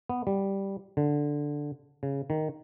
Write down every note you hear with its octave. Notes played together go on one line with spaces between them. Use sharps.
B3
G3
D3
C#3
D#3